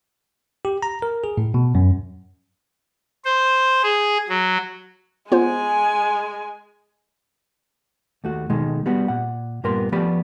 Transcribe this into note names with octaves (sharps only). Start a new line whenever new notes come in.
G4
A#5
A#4
G#4
A2
B2
F#2
C5
G#4
F#3
G#3 B3 F4 C5 G#5
D#2 A3 F#4
B2 D#3 G#3 A3
G3 B3 F#4
A#2 F#5
G2 A#2 B3 A#4 C6
F3 A3 B3 G4 D5 B5